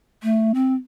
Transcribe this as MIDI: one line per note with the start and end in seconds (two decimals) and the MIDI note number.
0.23 0.52 57
0.55 0.75 60